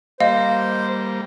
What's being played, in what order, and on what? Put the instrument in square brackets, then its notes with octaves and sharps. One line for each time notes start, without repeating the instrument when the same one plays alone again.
[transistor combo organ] G3 A#3 [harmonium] C5 [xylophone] D#5 [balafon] F5